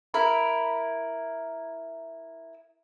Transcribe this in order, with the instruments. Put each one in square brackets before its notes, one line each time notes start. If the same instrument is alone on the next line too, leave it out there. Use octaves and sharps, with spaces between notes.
[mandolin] E4 A#4 B5